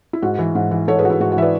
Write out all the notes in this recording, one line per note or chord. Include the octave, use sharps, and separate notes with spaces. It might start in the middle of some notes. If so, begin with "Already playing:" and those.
E4
G#2 F#4
E3
G#2
E3
G#2 A4 C#5
G#4 B4
E3 F#4
E4
G#2 F#4
F#4
E3 E5
B4 D5